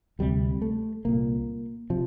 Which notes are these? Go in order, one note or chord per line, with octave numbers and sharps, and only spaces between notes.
D2 C3 G3
A3
C2 A#2 A#3
C3 F3